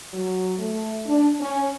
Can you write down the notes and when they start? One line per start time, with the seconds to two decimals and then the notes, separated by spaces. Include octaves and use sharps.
0.13 F#3
0.59 A3
1.06 D4
1.40 C#4